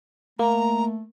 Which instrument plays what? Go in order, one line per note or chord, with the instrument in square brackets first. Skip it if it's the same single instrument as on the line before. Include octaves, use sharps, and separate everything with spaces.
[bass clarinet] A3 [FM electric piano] A#3 [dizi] A#5